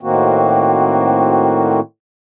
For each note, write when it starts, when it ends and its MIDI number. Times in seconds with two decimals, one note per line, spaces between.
0.01 1.80 45
0.01 1.80 51
0.01 1.80 58
0.01 1.80 60
0.01 1.80 66